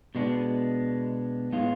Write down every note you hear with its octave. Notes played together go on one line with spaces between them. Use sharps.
B2 G#3 B3 D4
A2 G#3 B3 F4